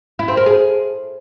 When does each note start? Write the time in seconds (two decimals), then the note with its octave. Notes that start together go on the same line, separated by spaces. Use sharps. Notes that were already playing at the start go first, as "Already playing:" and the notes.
0.19 E4
0.28 C4
0.37 A#4
0.46 G#4